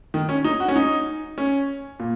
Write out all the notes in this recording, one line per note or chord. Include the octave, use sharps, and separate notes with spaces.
D#3
C#4
D#4
F#4
C#4
D#4
C#4
A#2